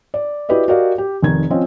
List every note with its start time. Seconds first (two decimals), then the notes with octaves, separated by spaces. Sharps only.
0.14 D5
0.49 E4 F#4 G4 B4 D5 D#5
0.68 F#4 G4 A#4 D5 D#5 F5
0.98 G4
1.22 F1 D#3 G#6
1.50 F3 C4 C#4 D#5